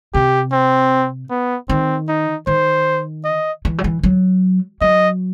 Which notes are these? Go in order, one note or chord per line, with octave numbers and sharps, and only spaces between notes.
C3 G4
C4
B3
D#3 C4
D#4
D#3 C5
D#5
E3
F#3
E3
F#3
F#3 D#5